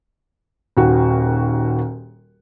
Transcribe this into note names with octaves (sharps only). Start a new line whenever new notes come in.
D#1 D#2 F#4